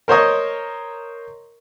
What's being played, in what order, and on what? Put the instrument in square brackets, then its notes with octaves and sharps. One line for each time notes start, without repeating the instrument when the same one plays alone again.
[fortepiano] A#4 C5 C#5 D#5